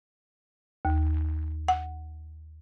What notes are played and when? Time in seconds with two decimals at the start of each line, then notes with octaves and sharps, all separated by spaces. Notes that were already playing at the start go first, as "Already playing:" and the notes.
0.85 D#2
1.68 F#5